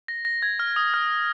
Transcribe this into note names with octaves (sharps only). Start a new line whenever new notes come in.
A#6
A#6
G#6
F6
D#6
F6